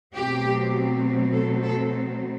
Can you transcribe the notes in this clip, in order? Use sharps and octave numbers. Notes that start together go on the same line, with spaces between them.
B2 F#3 A3 C4 G4
A4
A4